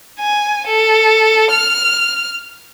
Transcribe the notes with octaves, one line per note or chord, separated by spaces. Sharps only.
G#5
A4
F6